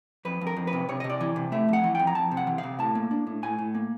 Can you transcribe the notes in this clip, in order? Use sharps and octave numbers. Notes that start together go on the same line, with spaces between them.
F2 B4
F2
A#4
F2
B4
C3
C3 C#5
C3 D#5
D5
E3
C3
A3 E5
F2 F#5
E3
F2 G5
A#5
F2 A5
C3
F#5
E3
F5
C3
A2 A5
A#3
D4
A2
A2 G#5
A2
A#3